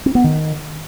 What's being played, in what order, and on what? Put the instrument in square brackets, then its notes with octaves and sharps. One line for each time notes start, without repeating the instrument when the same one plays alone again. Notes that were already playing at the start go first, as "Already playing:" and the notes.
[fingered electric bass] C4
B3
D#3